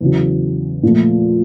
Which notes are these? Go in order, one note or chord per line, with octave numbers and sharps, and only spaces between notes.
E2 C#3 F#3
A#2 F3 A3